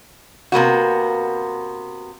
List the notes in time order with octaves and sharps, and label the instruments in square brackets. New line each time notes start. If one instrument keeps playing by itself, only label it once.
[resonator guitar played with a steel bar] C3 A#3 B3 F#4